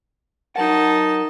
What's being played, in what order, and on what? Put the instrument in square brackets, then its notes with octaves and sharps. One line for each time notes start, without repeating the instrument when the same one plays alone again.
[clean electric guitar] F#3 A#4 F#5 [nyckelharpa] D#4 A5